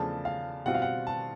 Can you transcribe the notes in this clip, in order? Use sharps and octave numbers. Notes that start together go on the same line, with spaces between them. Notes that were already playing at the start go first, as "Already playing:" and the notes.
Already playing: E2 C#3 F3 A3 D4 A5
F5
B2 G3 C4 F4 F#5
F5
F#5
A5